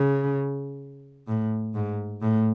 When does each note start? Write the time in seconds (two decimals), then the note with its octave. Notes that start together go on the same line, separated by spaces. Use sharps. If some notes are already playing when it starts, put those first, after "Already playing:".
Already playing: C#3
1.28 A2
1.74 G#2
2.22 A2